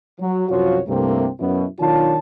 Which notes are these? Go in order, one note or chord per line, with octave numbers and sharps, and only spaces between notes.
F#3
C2 F#2 F3 F4 F#4 C#5
C2 G2 C3 A3 A#3 C4
F#2 B2 E4
B1 D#3 D4 F4 C#5 A5